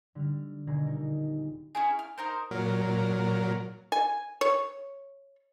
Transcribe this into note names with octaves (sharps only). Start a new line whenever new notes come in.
D3 G3 F6
D#1 B2 D3 G#4 A#5
D#4 A#4
C#4 E4 G#4
F6
D#4 A#4 C5
A#2 F#3 A#4
G#5
C#5